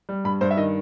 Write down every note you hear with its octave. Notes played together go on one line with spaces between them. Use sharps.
G3
G2 B5
G2 C5
E5
D#3 D#5